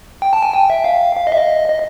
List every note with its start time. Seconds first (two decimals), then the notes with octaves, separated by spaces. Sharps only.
0.22 G5
0.33 A5
0.43 G#5
0.54 G5
0.70 E5
0.84 F5
1.16 F5
1.27 D#5
1.32 E5
1.37 D#5
1.70 D#5